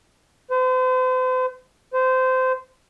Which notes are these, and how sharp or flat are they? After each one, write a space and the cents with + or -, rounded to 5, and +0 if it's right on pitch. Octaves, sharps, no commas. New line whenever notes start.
C5 -40
C5 -20